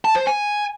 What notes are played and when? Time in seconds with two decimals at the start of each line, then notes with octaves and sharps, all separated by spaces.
0.05 A5
0.16 C5
0.27 G#5